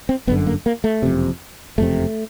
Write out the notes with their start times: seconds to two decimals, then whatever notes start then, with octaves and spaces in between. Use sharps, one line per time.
0.09 C4
0.27 G1 F#2 D3 B3
0.46 A#3
0.66 A#3
0.84 A3
1.02 F#1 F2 C3
1.78 F#1 F2 C3 A3